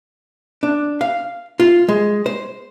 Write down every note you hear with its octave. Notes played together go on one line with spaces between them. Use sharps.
D4
F5
F4
G#3
C5